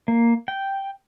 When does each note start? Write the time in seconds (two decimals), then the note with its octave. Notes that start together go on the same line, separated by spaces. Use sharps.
0.08 A#3
0.48 G5